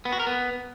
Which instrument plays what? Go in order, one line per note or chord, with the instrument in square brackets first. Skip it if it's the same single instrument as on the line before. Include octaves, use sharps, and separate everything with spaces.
[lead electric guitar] B3
F#4
A#4
B3